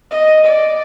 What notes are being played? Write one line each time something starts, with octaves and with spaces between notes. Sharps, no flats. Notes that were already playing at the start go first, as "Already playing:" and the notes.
D#5
D5